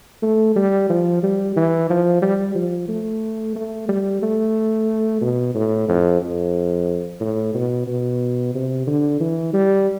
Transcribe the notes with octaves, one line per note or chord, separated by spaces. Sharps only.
A3
G3
F3
G3
E3
F3
G3
F3
A3
A3
G3
A3
B2
A2
F2
F2
A2
B2
B2
C3
D3
E3
G3